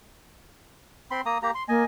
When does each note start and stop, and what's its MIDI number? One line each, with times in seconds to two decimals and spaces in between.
1.11 1.21 60
1.11 1.21 83
1.11 1.21 84
1.26 1.38 58
1.26 1.38 82
1.26 1.38 87
1.43 1.51 58
1.43 1.51 67
1.43 1.51 82
1.55 1.63 84
1.68 1.83 58
1.68 1.85 75
1.68 1.85 80